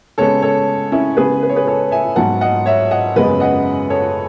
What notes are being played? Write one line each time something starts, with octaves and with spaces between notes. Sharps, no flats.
C#3 G#3 B3 A4 C#5
A4 C#5
C#4 E4
C#3 G#3 B3 G#4 B4
B4
C#5
G#4 B4
A4 C#5
E5 G#5
G#2 F#3 B3 F#5 A5
D#5 F#5
C#5 E5
D#5 F#5
F#2 C#3 G#3 B3 B4 D#5
D#5 F#5
A4 C#5